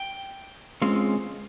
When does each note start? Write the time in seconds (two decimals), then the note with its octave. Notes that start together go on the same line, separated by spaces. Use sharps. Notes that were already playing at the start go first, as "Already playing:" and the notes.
Already playing: G5
0.82 C#2 C#3 G#3 C4 F4